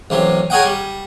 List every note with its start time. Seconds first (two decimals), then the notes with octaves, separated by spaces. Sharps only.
0.10 A1 C3 F#3
0.50 G#4 A#4 C#5 D#5 F#5 G5
0.65 G3